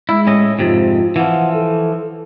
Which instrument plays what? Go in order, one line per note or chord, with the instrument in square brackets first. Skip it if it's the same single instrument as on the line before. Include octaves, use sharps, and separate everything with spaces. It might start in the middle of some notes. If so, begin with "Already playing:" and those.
[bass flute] G#3 [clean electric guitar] E4
[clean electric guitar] A2 C#4 D#5
[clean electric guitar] F2 G#2 C3 [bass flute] F4
[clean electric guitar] E3 F3 [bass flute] F#5
[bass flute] A4